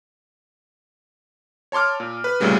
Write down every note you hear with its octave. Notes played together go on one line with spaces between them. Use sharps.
C#5 A5 C6 D6 F6
A#2
B4
C2 A#2 C#3 G3 A3